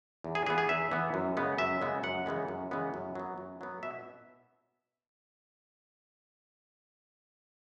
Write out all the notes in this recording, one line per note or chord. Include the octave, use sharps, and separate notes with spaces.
E2
G#4
E3 B3 G#4
G#4
E2 E5
E3 B3
F#2
C#3 G#3 B3
F#2 E5
C#3 G#3 B3
F#2 F#5
C#3 E3 G#3 B3
F#2
C#3 E3 G#3 B3
F#2
F#3 B3
F#2
F#3 B3
B2 E5